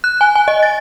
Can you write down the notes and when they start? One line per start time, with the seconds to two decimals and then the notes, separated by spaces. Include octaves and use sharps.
0.04 F#6
0.21 G#5
0.35 G#5
0.48 D#5
0.63 A6